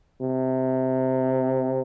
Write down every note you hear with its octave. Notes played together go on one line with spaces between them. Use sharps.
C3